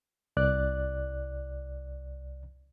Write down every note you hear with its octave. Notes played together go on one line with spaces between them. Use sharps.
C2 D5 F#6